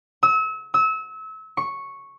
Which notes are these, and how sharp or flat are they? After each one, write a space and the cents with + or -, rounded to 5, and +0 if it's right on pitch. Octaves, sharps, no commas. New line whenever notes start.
E6 -35
E6 -30
C#6 -5